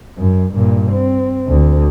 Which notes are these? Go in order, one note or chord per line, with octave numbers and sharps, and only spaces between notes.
F#2
G2 A#2
C4
D2